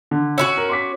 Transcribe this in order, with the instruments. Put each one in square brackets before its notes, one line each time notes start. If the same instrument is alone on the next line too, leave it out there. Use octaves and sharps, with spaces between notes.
[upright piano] D3
[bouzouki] C#4 E4 F#4 [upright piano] E6
[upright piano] A#4
C6 D6 B6